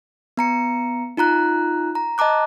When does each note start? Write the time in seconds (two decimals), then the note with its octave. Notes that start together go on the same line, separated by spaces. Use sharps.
0.37 B3 A#5 C#7
1.17 D#4 F4 A#5 F#6
1.95 A#5
2.18 D#5 A5 A#5 D6 F#6